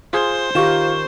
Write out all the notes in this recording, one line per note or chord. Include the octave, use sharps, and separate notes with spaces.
F4 G#4 C5
D#3 F4 G4 A#4 C#6 E7